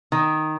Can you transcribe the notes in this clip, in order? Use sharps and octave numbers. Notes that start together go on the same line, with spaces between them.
D#3